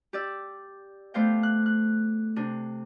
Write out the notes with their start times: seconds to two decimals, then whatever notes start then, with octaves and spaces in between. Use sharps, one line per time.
0.13 G4 D5 E6
1.14 A3 B3 C5 D5 F5 G5
1.43 F#6
1.66 F#6
2.36 C3 D4